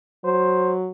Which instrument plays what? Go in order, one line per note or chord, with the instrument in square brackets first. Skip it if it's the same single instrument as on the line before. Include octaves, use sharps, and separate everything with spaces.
[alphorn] F#3 [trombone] C5